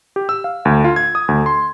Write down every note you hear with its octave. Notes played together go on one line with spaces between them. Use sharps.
G4
E6
F5
D2
F4
G#6
D#6
D2
C6